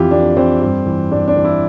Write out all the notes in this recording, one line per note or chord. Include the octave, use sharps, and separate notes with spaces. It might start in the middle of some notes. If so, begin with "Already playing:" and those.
Already playing: F2 E3 E4 F4 G4
F2 D4
E3 C4
G2
E3
G2 D4
D4
E3
E4